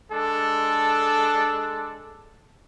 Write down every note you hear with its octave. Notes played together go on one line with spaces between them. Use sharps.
G#3 D4 A4